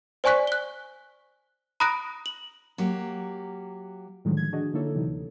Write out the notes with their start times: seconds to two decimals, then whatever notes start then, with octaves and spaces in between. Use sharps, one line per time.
0.24 C5 D5 G#5 C#6 F#6 B6
0.47 F#6 G7
1.80 A#5 B5 D#6 F#6 A#6 D7
2.26 F#7
2.78 F#3 A#3 F#4 G4
4.25 A2 D3 D#3 F3 F#3 G#3
4.37 G#6
4.52 D4 F#4 G#4 D#5
4.74 D3 A#3 D#4 E4 A4 C#5
4.95 C3 E3 F#3 D#4
5.07 D2